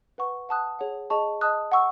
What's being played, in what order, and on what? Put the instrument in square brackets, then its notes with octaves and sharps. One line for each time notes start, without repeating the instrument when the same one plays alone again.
[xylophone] B4 F#5 C#6
F#5 A5 D#6 F#6
G#4 C#5 F#5
G#4 D#5 A5 C#6
D#5 A5 D#6 F#6
F#5 C#6 E6